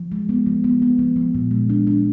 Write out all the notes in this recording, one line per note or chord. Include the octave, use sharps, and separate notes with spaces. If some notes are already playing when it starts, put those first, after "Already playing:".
Already playing: F3
G#3
B3
F3
B3
B3
F3
F3
A#2
G#3
D4
D4